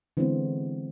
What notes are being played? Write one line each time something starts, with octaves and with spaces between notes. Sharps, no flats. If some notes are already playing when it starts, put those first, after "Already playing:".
D3 E3 G#3 B3 C4